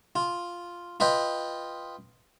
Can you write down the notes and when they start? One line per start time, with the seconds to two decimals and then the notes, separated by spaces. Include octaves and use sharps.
0.16 F4
1.00 F4 B4 D#5 G5